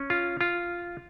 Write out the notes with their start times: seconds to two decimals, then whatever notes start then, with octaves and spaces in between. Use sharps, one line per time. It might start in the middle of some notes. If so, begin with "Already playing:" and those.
Already playing: C#4
0.10 F4
0.41 F4